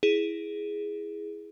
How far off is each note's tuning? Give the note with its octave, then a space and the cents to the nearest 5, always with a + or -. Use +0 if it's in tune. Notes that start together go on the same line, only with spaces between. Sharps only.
E4 +0 G#4 +0